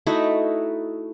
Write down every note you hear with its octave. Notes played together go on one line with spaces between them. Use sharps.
A3 D#4 E4 F#4